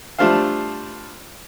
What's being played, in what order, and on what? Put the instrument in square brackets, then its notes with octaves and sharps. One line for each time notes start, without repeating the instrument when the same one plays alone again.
[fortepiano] G3 A3 D4 F4 C5 F5